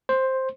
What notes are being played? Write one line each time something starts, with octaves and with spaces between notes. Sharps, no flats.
C5